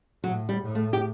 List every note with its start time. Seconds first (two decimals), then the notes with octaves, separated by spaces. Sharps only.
0.24 A2 F#3
0.49 G3
0.62 A2
0.75 A3
0.93 G4